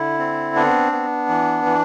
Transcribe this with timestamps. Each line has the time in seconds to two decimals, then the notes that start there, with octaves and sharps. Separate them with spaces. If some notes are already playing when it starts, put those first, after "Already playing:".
Already playing: D3 E4
0.19 C4
0.55 B3 D4
0.92 B3
1.29 E3
1.65 E3